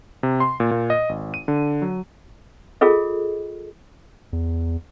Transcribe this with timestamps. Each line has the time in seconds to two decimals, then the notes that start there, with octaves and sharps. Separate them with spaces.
0.23 C3
0.40 C6
0.60 A#2
0.71 A#2
0.90 D#5
1.09 G#1
1.34 D#7
1.48 D3
1.82 F#3
2.81 F4 G#4 A4 D#5
4.33 E2